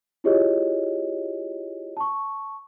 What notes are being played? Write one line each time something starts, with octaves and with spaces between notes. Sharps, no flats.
E4 F4 G4 G#4 C#5 D#5
A5 C#6